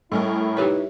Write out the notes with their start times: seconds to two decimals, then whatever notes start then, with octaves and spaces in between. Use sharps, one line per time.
0.12 A2 G3 C#4 E4 A#4
0.57 D#4 G4 B4 C#5 B5